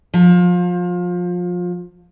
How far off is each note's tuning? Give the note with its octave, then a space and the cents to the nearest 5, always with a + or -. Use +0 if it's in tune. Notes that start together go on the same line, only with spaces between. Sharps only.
F3 +25